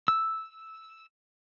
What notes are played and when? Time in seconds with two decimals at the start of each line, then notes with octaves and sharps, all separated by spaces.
0.08 E6